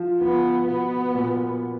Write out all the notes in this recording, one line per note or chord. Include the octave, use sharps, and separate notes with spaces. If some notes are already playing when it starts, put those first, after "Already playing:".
Already playing: F3
F3 B3
B2 B3
A#2